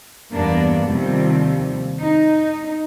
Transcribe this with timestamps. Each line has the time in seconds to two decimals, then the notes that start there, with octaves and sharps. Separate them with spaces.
0.33 E2 G2 A#3 B3 D4
0.86 D#2 C3 F3 G3
2.00 D#4